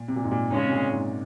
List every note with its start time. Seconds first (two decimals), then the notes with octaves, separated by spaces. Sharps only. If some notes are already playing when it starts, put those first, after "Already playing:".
Already playing: A#2
0.08 C3
0.16 A#2
0.24 G#2
0.32 A#2
0.50 G#2 C#3 G#3 C#4
0.65 C3
0.71 A#2
0.92 G#2